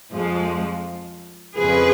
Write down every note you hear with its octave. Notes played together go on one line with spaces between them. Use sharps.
F2 F3 G#3
F2 C#3 F3 G#4 B4